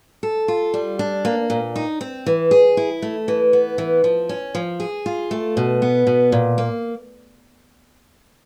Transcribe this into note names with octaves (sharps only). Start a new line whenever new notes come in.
A4
F4
G3
D4
A#3
A#2
D#4
C4
E3
G#4
E4
A3
E3
B3
E3
F3
C#4
F3
G#4
F4
A3
B2
B3
B2
A#2
A#3